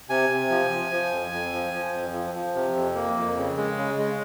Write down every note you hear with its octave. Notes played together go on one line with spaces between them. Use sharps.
C3 G#5
C3
F3
F3
F3
F2
F2
F3
F3
F2
F3
F3
C3
F2
A#3
F2
C#3
G#3
C#3
G#3